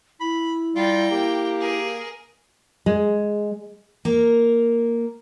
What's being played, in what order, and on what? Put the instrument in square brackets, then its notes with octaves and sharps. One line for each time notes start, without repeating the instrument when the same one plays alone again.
[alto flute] E4 [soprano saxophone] B5
[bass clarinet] G3 [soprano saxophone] F4 [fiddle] G5 A#5
[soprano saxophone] A#3 [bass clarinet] G4
[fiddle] G#4 A#4
[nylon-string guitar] G#3
[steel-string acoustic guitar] A#3 A#4